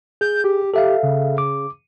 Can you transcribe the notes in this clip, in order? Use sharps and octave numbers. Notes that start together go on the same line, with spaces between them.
G#4 G6
G4
G4 A4 E5 F5
C#3
D6